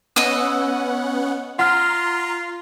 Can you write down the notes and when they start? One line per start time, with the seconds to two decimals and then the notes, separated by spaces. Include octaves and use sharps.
0.16 B3 C#4 D#5 F#5 E6
1.59 F4 F#5 A#5 C6 F6